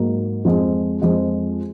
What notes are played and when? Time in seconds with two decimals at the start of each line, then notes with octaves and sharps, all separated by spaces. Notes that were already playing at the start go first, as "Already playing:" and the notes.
Already playing: G#2 F#3 A#3
0.45 F2 F3 G#3
1.02 F2 F3 G#3